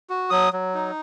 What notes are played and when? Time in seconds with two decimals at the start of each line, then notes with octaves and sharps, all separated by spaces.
0.10 F#4
0.30 F#3 D#6
0.53 F#3
0.74 D#4